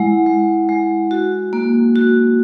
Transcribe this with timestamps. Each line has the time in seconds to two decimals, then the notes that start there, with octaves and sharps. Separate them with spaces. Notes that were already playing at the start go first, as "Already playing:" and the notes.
Already playing: G#3 E4 F#5
0.26 G#3
0.69 G#3
1.11 F#4
1.53 A#3
1.96 F#4